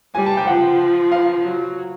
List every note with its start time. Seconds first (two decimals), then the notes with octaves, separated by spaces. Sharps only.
0.15 G3 G#5
0.26 A5
0.37 G5
0.47 F3 F#5
1.12 F5
1.44 F#3